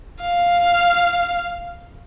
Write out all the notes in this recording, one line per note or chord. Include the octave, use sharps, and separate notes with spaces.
F5